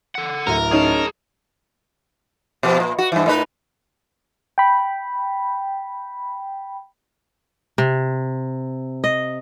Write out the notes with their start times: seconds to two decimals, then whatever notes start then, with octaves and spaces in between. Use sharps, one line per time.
0.15 A4 F#5
0.47 D1 E4 A#4
0.72 C#4 D#4 G#4 A5
2.63 B2 F3 B3
2.80 A#2
2.99 F#4
3.12 G2 E3
3.26 A2 D#4 B4
4.58 G5 B5
7.78 C3
9.04 D#5